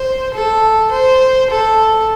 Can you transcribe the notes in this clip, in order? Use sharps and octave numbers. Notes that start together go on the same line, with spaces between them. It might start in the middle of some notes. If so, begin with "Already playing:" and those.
Already playing: C5
A4
C5
A4